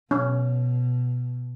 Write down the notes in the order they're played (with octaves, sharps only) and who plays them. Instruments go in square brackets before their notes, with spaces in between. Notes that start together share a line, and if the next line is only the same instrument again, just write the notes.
[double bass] B2 [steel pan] C#4